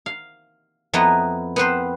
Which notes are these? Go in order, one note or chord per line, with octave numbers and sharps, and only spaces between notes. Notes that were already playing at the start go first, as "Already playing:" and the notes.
F5
F2 B3 E4 B4 D#5 A#5
B3 C4 B4 C5